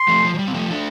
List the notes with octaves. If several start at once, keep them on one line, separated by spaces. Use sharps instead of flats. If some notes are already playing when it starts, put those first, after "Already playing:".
Already playing: C6
F3 A3
F3
F3
G3
C4
F3 A3
A3 D4